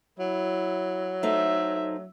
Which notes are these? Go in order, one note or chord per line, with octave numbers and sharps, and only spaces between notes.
F#3 E4
A3 D#4 C5 E5